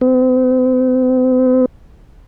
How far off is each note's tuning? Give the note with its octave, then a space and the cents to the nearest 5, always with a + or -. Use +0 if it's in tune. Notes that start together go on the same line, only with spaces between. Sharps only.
C4 -40